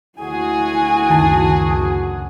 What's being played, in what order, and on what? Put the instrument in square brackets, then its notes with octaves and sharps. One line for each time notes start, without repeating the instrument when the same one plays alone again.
[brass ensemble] D2 F#4 G#4 [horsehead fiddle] E4 G#5
[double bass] C#2 F#2 [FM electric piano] D#3 A5